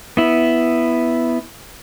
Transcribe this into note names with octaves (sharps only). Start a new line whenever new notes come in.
B3 E4